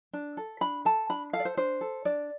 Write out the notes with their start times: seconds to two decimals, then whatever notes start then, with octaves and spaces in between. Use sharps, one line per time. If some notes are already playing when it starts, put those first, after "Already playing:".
0.13 D4
0.37 A4
0.61 D4 B5
0.85 A4 A5
1.09 D4 B5
1.33 A4 F5
1.40 D5
1.45 C5
1.57 D4 C5
1.81 A4
2.05 D4 D5